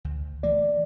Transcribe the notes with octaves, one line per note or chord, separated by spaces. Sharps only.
D2
E3 A3 A#3 D5